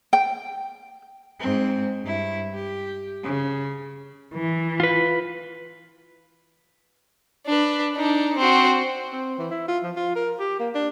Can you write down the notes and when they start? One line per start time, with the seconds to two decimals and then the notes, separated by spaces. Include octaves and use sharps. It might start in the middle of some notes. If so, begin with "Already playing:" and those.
0.13 G5
1.40 G#2 C4
2.02 G2 E4
2.55 G4
3.23 C#3
4.35 E3
4.80 F4 B4
7.46 D4 B4
7.96 D4 D#4
8.37 C4 F#4
9.13 C4
9.38 E3
9.51 E4
9.68 F4
9.83 F3
9.96 F4
10.16 A#4
10.39 G4
10.59 A#3
10.75 D4